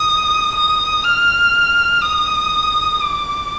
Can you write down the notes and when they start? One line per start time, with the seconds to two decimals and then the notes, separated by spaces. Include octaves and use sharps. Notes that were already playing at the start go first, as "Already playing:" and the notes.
Already playing: D#6
0.55 D#6
1.04 F6
2.02 D#6
3.01 D6